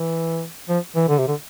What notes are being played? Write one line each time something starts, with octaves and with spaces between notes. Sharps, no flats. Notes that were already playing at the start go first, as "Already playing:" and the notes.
Already playing: E3
F3
E3
D3
C3
D3